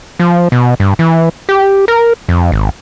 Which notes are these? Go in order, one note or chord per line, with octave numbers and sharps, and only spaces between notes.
F3
B2
G2
E3
G4
A#4
F2
G#1